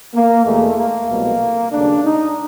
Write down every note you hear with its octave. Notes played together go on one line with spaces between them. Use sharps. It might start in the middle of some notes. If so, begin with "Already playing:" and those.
A#3
E2 B2 G#3 A3
A#3
C2 B2 F#3 A3
D#2 C#3 F#3 A3 D4
D#4